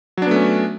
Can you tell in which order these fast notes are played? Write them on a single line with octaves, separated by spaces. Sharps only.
F#3 D4 B3 A3 C#4